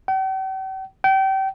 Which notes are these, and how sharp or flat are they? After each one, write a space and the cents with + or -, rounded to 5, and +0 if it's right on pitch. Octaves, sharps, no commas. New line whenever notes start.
G5 -45
G5 -30